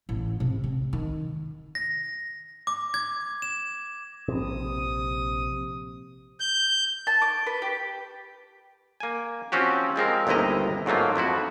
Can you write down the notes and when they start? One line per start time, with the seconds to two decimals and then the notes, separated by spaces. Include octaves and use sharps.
0.09 A1
0.40 C3
0.64 C4
0.93 D#3
1.75 A#6
2.67 D6
2.94 G#6
3.42 E7
4.28 A#1 C3 D#6
6.40 G6
7.07 A5
7.22 D6
7.47 B4
7.62 G4
9.00 A#3 G#5
9.52 F3 C4 C#4 F#4 G4
9.96 F3 G#3 C4 A#4
10.27 G1 D#2 C3 E4 D#5 A#5
10.86 G#2 F#3 A3 A#3 F4
11.16 F2 F3 E4 F#4